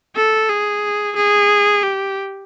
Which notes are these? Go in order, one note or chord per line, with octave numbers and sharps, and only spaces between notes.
A4
G#4
G#4
G4